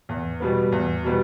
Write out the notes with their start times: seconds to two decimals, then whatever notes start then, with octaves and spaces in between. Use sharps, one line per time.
0.09 E2
0.40 B2 G3 B3
0.72 E2
1.03 B2 G3 B3